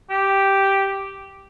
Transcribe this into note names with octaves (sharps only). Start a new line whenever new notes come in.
G4